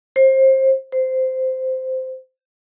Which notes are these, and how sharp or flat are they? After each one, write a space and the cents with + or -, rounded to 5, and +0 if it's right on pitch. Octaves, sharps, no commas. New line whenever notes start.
C5 +25
C5 -10